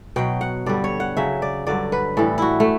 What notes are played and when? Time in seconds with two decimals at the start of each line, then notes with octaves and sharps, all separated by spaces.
0.16 B2 F#3 G5
0.41 F#5
0.66 G2 D3 G3 D5
0.84 C#5
1.00 F#5
1.17 C#3 F#3 E5
1.42 D5
1.67 G2 D3 F#3 D5
1.92 B4
2.17 A2 E3 G3 A4
2.38 E4 F#4
2.60 A3